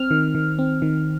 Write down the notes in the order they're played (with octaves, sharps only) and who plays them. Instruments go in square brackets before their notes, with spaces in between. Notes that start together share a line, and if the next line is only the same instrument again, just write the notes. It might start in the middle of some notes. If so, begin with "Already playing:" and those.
Already playing: [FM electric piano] C4 F6
D#3
D#3
C4
D#3